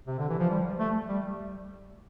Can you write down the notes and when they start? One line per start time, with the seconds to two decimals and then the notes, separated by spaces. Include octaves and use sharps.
0.07 C3
0.18 D3
0.29 E3
0.39 F3
0.50 G3
0.79 A3
1.09 G3